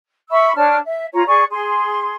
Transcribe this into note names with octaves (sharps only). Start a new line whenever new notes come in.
E5 B5 C#6 E6
D4 C#5 A5 F6
E5
F4 C#5 A#5
G#4 D5 C#6
G#4 C6